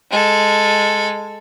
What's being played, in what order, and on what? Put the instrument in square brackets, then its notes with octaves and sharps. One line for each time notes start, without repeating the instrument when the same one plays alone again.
[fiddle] G#3 A4